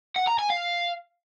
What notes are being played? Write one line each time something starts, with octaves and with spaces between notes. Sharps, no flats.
F#5
A#5
G#5
F5